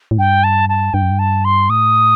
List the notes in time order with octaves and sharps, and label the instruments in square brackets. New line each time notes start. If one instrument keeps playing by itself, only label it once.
[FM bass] A2
[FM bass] G2 [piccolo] G5
[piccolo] A5
A5
[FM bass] G2 [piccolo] G5
[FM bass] F#2
G2
[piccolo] A5
C6
[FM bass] A2 [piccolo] D#6